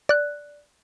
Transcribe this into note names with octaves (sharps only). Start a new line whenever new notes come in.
D5 F#6